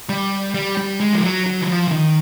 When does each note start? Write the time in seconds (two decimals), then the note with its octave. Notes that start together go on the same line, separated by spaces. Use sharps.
0.09 G3
0.55 G3
0.77 G3
1.00 G#3
1.13 F3
1.24 F#3
1.46 F#3
1.62 E3
1.68 F3
1.88 E3
1.91 D#3